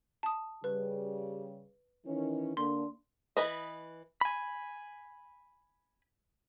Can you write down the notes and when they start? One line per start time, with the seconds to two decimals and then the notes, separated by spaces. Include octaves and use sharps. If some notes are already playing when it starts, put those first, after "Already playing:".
0.23 A5 D#6
0.64 C#3 G3 B4
2.06 D#3 E3 C#4
2.57 D3 A#3 D4 C6
3.37 E3 B4 D#5
4.21 G#5 B5